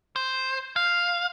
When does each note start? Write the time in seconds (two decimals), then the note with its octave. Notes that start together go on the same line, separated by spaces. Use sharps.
0.16 C5
0.76 F5